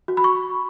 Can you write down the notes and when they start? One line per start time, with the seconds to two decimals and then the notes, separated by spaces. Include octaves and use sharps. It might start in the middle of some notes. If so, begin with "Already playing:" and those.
0.08 F#4
0.17 B5
0.24 C#6